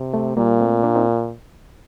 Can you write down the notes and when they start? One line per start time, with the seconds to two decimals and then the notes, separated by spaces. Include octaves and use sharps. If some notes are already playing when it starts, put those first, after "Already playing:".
Already playing: C3
0.14 A3
0.37 A#2 G3 A#3
0.60 A3 C4
0.83 A#3 D4
0.95 C4 D#4